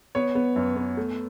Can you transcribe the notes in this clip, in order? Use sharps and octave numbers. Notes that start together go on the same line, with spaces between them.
B3 C#5
B3
F#2
B3
A3